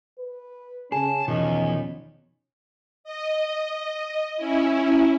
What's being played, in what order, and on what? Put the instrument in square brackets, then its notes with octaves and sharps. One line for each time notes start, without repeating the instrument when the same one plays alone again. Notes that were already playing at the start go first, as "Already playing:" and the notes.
[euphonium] B4
[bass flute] C#3 [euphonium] C#4 [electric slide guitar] G#4 [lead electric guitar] A5
[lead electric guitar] E2 [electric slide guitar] B2 D#3 F3 [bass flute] D#5
[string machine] D#5
C#4 E4